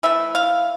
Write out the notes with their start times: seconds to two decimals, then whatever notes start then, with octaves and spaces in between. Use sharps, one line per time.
0.03 E3 A3 E5
0.35 F5